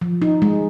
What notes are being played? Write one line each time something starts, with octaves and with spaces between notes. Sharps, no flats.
F3
D#4
G#3